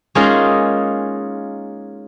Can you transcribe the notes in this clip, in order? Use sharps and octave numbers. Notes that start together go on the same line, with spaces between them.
G#3 A#3 C#4 D#4 F4 G#4